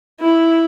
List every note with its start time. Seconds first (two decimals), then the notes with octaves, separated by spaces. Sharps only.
0.20 E4